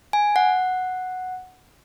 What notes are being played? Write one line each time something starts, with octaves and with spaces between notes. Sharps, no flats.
G#5
F#5